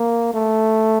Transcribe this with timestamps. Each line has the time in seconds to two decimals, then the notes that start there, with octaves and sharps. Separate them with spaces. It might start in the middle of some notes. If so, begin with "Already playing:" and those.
Already playing: A#3
0.34 A3